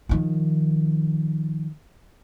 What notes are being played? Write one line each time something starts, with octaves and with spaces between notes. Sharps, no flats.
D#3 F3